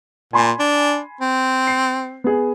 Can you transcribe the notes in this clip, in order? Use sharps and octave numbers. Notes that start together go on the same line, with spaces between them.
A#2 G#5 B5 C6
D4
C4
C7
B3 G#4